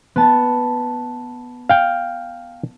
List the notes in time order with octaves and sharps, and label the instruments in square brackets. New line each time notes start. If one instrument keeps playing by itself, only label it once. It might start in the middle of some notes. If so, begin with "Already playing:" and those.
[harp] B3 A5
[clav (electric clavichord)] F5 G5